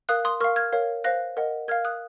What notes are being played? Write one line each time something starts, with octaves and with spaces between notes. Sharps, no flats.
A#4 F5 D#6 F#6
C6 D#6
A#4 F5 C#6 F6
F6 G#6
A#4 C#5 F5
C5 F5 F#6 A#6
A#4 D#5 F#5
A#4 F5 F6 G#6
D#6 F#6